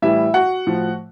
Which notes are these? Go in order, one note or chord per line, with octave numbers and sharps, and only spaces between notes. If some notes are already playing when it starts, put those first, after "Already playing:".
A2 E3 G3 E4 E5
F#4 F#5
A2 F3